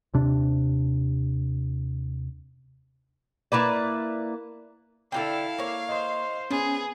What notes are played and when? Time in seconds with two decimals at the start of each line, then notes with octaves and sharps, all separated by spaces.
0.14 D#2 C3 D4
3.52 A#3 E4 B4 D5
5.12 D3 E4 F#4 A4 F5 G5
5.58 A#3 C#5
5.89 C5 D#5
6.51 B3 C#4 G#4